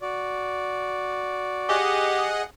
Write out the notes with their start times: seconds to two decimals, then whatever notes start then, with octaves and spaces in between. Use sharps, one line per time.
0.01 F#4 D5
1.69 G4 G#4 D#5 F#5